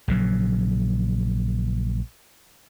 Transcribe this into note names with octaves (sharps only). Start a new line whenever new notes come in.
A#1 C#3 F#3